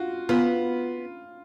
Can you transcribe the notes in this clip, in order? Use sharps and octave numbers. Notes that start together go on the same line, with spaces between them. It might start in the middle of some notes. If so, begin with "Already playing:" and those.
Already playing: F4 F#4
B3 F4